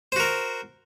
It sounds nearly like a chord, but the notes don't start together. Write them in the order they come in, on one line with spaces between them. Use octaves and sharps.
C5 F#4 A#4